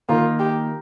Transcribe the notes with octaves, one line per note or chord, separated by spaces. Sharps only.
D#3 A#3 D#4 F4 A#4
G4